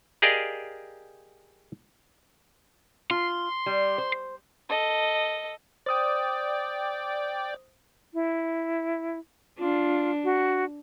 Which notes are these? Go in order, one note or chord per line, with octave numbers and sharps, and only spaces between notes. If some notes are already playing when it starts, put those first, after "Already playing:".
G4 G#4 A#4 D5 D#5 F5
F4 C6
G3
C5
A4 D#5
C5 D5 G5 D#6
E4
D4 F4
F#4